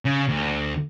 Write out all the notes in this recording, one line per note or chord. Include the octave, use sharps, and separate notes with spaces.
C#3
D2